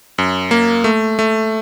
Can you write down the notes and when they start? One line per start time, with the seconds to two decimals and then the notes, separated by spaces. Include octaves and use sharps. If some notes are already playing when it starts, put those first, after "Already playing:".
0.18 F#2
0.51 A#3
0.84 A3
1.19 A3